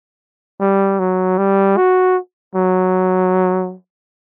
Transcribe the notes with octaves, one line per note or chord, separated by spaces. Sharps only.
G3
F#3
G3
F#4
F#3